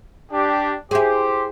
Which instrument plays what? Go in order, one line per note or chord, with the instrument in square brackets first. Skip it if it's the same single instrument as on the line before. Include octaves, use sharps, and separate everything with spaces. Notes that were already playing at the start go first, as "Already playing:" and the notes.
[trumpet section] D4 G4
[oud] E4 G#4 [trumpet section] G4 C5